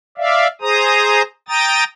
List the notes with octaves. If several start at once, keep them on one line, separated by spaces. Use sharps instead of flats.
D5 E5 F5
G#4 C5 A#5 D#6
G5 A#5 D#6 A6